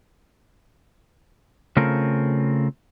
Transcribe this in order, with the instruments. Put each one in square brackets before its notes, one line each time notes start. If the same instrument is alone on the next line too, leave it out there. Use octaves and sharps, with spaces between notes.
[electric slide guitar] C#3 A3 C4 F4 A#4